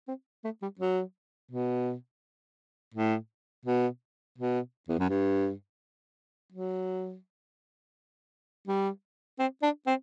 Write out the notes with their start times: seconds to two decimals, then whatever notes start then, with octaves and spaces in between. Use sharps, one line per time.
0.08 C4
0.44 A3
0.62 G3
0.79 F#3
1.51 B2
2.94 A2
3.66 B2
4.38 B2
4.88 E2
4.99 F#2
5.09 G2
6.52 F#3
8.67 G3
9.39 C4
9.62 D4
9.87 C4